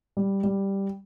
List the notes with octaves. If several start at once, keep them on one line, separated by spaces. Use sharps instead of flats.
G3
G3